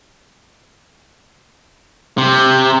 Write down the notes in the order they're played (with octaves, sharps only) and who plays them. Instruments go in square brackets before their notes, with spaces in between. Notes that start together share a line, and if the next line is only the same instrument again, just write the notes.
[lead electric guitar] C3